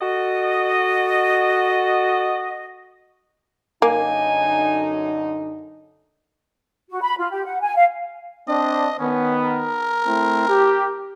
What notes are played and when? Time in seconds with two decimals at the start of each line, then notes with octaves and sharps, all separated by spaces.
0.01 F#4 A4 D#5
3.82 F#2 D3 A#3 D#4 G#5
6.90 F#4
7.02 B5
7.18 F4
7.31 G4
7.45 F#5
7.61 G#5
7.76 F5
8.48 C4 D4 D#5
8.99 D#3 B3 C#4
9.44 A#4
10.06 A3 C4 E4
10.49 G4